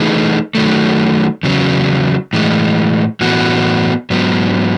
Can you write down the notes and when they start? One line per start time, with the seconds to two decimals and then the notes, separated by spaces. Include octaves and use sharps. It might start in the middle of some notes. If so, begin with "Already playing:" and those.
Already playing: E3 A3 D#4 G#4 B4
0.55 D#3 F#3 A3
1.43 E2 C#3 F#3
2.33 A2 E3 G#3
3.21 A2 E3 B3 F#4
4.10 G#2 F#3 B3